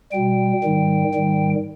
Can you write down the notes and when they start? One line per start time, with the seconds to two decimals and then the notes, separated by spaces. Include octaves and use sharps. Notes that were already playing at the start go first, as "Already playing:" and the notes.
0.12 B2 G3 G5
0.64 G#2 D#3 G3
1.14 G#2 D#3 G3